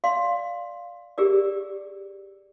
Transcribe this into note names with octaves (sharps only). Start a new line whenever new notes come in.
D5 F5 C6
G4 G#4 A#4 D5